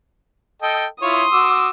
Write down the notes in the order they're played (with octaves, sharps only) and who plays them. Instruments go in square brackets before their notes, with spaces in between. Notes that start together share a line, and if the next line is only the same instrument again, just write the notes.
[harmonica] A4 D#5 G5
[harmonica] E4 F4 C#5 [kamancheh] C6 D#6
[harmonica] F#4 D6 E6